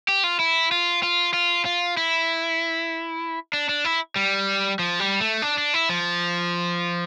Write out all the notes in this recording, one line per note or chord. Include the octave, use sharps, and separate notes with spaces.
G4
F4
E4
F4
F4
F4
F4
E4
D4
D4
E4
G3
F3
G3
A3
D4
D4
E4
F3